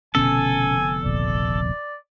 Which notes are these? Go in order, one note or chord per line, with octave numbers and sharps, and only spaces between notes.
F1 B2 D3 B3 C#4 A4 G#5
D#1 A#1 D5